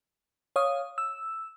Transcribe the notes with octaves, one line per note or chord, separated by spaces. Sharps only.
C#5 F5 D#6
E6